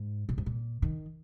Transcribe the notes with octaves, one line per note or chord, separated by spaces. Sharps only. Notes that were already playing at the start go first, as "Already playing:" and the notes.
Already playing: G#2
A#2
G#2
A#2
D#3